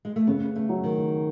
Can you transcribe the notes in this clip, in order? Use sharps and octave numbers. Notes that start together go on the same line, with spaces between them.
G#3
A3
C#3 B3
A3
F#3
D#3